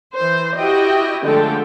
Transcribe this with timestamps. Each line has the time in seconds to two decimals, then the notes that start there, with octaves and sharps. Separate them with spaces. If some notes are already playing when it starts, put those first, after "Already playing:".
0.14 E3 C5
0.58 E4 F#4 G4 D#5 G5
1.25 D3 F3 G#3 A3 A4 G5